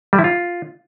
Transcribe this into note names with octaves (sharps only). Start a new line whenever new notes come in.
G3
E4
F4